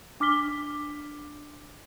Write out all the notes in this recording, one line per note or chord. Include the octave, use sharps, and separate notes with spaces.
D4 D6 F6 B6 G7